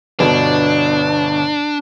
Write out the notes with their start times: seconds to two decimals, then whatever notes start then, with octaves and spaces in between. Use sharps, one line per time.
0.20 G1 B2 D4